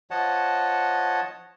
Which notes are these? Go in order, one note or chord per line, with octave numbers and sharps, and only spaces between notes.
F3 C#5 D#5 F#5 A5